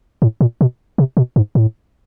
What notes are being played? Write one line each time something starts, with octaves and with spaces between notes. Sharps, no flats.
A2
A#2
B2
C3
B2
G#2
A2